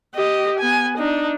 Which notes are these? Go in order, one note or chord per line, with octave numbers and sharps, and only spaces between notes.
G4 D#5
B3 G#5
D4 D#4